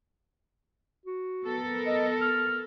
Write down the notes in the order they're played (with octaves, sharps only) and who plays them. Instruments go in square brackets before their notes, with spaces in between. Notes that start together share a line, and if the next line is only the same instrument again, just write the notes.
[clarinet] F#4
[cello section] B3 A4 A#4
[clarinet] D#5
F6